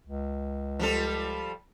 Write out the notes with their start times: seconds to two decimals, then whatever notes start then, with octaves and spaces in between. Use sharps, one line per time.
0.07 C#2
0.79 F3 G3 A4